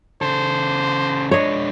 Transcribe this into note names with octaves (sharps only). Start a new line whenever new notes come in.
C#3 A4 C5
G#3 D4 C#5 D#5